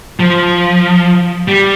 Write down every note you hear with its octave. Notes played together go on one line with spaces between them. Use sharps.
F3
G3